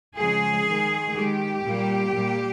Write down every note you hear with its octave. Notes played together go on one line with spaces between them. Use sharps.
C#3 F3 G#3 G#4
D#3 G#3
D#3 G#3 G4
A#2 G3 A#3
A#2 G3 A#3